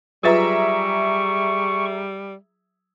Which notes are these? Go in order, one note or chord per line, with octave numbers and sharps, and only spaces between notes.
F#3 G3 F4 G#4 B4 E5 A#5 C#6